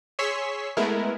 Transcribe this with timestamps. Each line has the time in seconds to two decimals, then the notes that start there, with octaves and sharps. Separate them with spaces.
0.19 G#4 C#5 C6 C#6 E6 B6
0.77 G#3 A3 B3 E4 A#4